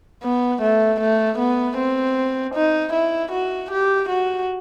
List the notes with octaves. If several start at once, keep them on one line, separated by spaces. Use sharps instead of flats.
B3
A3
A3
B3
C4
D#4
E4
F#4
G4
F#4